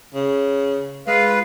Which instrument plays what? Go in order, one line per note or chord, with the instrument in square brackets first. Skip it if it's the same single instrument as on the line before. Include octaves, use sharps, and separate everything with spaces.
[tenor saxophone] C#3
[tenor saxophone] G#3 [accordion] F4 B4 F5